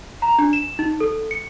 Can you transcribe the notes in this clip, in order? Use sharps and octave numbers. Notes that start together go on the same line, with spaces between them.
A#5
D4
E7
D#4
A4
C#7